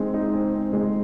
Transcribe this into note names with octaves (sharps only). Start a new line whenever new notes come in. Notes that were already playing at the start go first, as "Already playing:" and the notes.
Already playing: G#3 C4 D#4
D#4
C4
C4
G#3